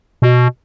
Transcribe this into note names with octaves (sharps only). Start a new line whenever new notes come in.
B2